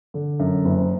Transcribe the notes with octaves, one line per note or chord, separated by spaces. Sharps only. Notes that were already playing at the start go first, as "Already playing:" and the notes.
D3
F#2
F#1